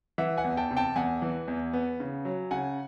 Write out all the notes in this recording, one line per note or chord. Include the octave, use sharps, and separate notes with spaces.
E3 E5 F#5
F#5 G#5
E2
G5 A5
C3
G5 A5
E2 F#5 G#5
E3
E2
B3
C#3
F#3
C#3 F#5 G#5